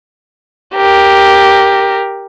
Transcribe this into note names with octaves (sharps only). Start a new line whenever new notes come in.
G4 A#4